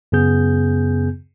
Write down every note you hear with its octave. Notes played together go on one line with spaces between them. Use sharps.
F#2 C#3 B3 G#4 G6